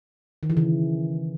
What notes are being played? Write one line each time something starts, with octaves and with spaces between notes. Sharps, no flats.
D#3
E3
C#3